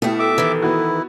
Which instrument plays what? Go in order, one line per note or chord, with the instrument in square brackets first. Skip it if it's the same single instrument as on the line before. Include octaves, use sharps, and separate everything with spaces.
[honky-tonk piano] B2 G4 [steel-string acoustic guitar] A3 E4
[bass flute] A4 [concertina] E5 D6
[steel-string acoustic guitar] D#3 E3
[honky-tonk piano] B3 F#4 [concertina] E4